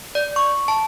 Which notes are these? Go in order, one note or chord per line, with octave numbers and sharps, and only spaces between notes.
D5
C#6
A5